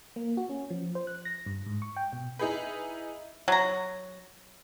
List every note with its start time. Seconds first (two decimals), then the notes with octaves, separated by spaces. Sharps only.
0.16 A#3
0.37 F#4
0.49 C#4
0.70 F3
0.95 C5
1.07 F#6
1.25 A#6
1.46 G2
1.66 G#2
1.82 C#6
1.96 G5
2.13 B2
2.39 D#4 E4 G#4 B4
3.48 F#3 A#5